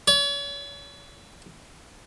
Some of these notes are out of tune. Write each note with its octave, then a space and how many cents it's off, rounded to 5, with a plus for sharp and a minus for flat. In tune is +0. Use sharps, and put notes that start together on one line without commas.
C#5 +40